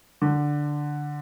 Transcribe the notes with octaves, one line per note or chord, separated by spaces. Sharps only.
D3